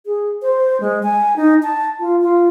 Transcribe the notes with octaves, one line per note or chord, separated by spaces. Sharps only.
G#4
C5
G#3
G#5
D#4
A5
F4
F4